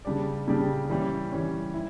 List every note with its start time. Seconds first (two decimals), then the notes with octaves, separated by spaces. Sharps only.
0.05 C#3 G3 D4 G4 D5
0.48 C#3 G3 D4 G4 D5
0.89 E3 G3 C#4
1.32 E3 G3 C#4
1.74 E4